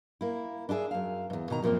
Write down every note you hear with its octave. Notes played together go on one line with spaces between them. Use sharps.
A#3 E4
D4 E4 G#4 E5
F#2 F5
E2 G#2
B2 D#3 A#5
F#2 A#2 F3 A#3 C4